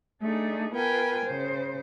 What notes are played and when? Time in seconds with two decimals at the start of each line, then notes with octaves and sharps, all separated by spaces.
0.21 A3 D4 D#4 G#4
0.74 B3 F4 A#4 B4 G5 G#5
1.24 C#3 C5